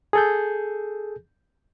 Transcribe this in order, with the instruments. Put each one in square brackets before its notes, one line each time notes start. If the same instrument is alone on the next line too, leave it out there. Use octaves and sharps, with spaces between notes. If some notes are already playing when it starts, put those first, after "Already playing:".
[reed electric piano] G#4 A4 G6